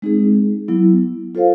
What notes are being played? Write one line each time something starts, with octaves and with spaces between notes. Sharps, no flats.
G#3 C4 D#4 G#4
F#3 B3 E4
F4 A4 C5 F5